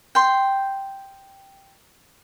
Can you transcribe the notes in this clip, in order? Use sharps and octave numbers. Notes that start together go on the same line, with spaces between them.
G5 C6